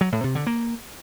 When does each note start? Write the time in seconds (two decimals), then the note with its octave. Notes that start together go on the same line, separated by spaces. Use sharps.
0.01 F#3
0.12 A2
0.24 C3
0.35 D3
0.47 A#3